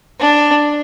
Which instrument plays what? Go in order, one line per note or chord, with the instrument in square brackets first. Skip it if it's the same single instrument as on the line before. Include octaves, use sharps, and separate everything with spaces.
[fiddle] D4